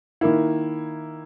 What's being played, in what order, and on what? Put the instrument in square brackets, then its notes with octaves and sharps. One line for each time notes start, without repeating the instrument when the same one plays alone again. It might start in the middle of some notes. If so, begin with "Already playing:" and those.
[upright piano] D#3 A#3 E4